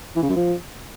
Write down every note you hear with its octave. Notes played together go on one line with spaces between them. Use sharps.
E3
C#3
F#2
F3